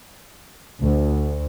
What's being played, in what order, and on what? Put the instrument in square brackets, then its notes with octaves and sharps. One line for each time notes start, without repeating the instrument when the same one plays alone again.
[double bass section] D2